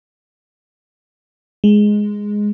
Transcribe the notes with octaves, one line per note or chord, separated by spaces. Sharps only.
G#3